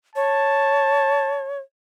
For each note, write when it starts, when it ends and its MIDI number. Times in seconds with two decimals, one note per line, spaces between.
0.16 1.59 73
0.16 1.49 81